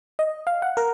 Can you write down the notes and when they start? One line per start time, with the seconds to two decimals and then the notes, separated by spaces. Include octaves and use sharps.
0.19 D#5
0.47 F5
0.62 F#5
0.77 A#4